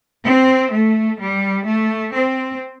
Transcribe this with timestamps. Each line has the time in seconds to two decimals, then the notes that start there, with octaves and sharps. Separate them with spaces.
0.24 C4
0.71 A3
1.19 G3
1.65 A3
2.13 C4